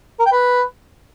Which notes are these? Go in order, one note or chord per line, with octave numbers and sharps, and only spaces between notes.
A#4
G5
B4